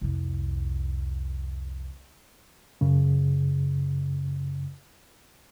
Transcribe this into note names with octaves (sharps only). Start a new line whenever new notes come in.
C2 F2
F#2 C#3